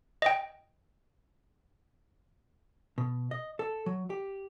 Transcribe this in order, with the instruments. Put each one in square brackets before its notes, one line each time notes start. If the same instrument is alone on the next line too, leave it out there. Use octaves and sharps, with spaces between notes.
[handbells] D#5 G5
[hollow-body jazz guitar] B2
D#5
A4
F#3
G4